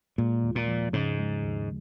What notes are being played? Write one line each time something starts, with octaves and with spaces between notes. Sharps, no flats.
A#2 G#3
D#2
A#2
F3
G#2 C#3
G#3
D#2